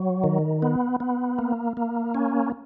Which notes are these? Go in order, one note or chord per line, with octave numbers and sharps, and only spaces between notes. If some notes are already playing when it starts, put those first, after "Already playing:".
Already playing: F#3
D#3
B3
B3
A#3
A#3
C#4